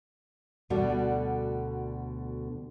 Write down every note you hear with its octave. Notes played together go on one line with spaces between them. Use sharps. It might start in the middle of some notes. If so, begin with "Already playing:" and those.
D2 B2 D3 G3 F#4 D5